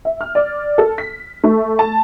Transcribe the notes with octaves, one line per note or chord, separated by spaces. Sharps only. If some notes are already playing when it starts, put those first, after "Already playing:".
E5
F6
D5
A4
B6
A3
A5